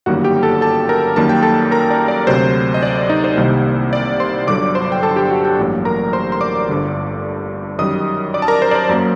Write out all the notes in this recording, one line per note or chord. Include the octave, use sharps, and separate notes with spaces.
G1 F#2 D#3 G3 A#3 F#4 F#5
G4 G5
A4 A5
A4 A5
A#4 A#5
F#2 D#3 G3 A#3 A5
G5
A4 A5
A#4 A#5
D5
D5
D2 C3 F#3 C5
D#5
D5
D#4 D#5
C5
C2 C3 D#3 G3 A#3
D5
C5 C6
G1 G2 D3 F#3 D5 D6
C5 C6
G5
A4 A5
G4 G5
F#4 F#5
G4 G5
A1 G2 F#3 A#3
A#4 A#5
C5 C6
C6
D5 D6
G1 G2 D3
F#2 D#3 G3 D#5 D#6
D5 D6
A5
A#4 A#5
C5
D5
C5
F#2 F#3 A#3